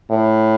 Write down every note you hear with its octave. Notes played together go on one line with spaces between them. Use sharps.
A2